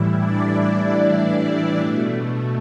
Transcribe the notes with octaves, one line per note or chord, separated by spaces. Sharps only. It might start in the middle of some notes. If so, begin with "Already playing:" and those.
Already playing: A2 E3 G3 E4
D4 D5
B2 A3